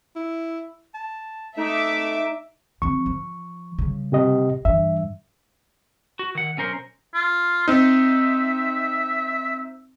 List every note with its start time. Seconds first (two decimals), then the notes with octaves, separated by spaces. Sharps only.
0.15 E4
0.94 A5
1.57 A3 D#4 E5 D6
2.82 F3 C4 C#6
3.06 F3
3.79 C#3 G3
4.12 C3 G4 D#5
4.65 G2 E3 E5
6.19 F#4
6.35 D#3 F#5
6.57 B1 C#4 A#4 C5
7.14 F4
7.68 C4 D#4 E5